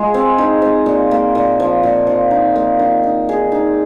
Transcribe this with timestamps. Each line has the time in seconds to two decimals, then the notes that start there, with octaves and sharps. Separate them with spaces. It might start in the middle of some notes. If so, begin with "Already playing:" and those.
Already playing: G#3 F4 G#4
0.14 C4
0.38 D#4
0.62 C4
0.86 A#2
1.11 A#3
1.35 A#2
1.60 F3
1.83 A#2
2.07 F3
2.31 D#4
2.56 A#3
2.79 D#3
3.03 D#4
3.29 G#4
3.52 D#4